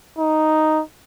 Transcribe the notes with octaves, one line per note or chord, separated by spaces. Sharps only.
D#4